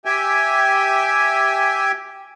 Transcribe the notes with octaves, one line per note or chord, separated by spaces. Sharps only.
G4 E5 G5 G#5